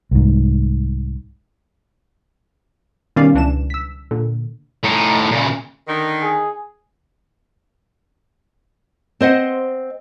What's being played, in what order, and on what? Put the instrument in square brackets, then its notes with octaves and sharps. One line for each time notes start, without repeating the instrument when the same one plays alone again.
[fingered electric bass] C2 G#2
[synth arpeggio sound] B2 D#3 G3 C#4 D5 F5
C#2 E3 D4 E7
E6 B6
A#2 D3
[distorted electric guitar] A2 D#4
A#2 C#3
[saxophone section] D3 D#3
[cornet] G#4
[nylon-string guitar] C4 C5 D#5 F#5